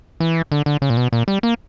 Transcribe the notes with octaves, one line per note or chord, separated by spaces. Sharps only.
E3
D3
D3
C#3
A#2
B2
A#2
G3
A#3